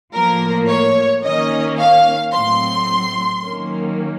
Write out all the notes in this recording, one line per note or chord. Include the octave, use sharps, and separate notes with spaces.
A2 F3 A#3 A#4
C#5
D#3 A#3 C#4 D#5
F5
A2 F#3 C4 C6
D#3 F#3 A#3 C#4